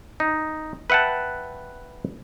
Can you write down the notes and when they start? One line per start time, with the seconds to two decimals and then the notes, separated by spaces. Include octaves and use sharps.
0.20 D#4
0.90 B4 E5 F#5 G5 A5